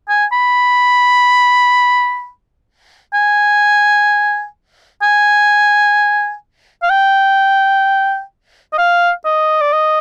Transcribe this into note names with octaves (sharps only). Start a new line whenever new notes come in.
G#5
B5
G#5
G#5
F5
G5
D#5
F5
D#5
D5
D#5